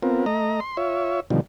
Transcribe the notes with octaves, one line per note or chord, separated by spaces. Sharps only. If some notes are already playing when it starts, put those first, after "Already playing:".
B3 C4 F4 A#4
A3 D#5 A#5
C6
F4 C#5 E5
B2 D3 D#3 F3 G3